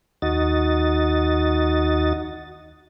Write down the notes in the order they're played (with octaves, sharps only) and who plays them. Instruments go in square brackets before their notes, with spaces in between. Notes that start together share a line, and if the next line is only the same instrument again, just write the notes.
[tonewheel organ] D#2 D#4 F#4 D#5 A6